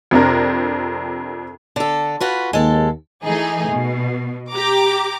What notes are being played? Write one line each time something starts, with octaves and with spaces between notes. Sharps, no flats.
F2 C3 D4 A#4
D3 A4
F4 F#4 B4
D#2 G#3 A4
E3 A3 D#4 G#4
B2
G4 A#5 D6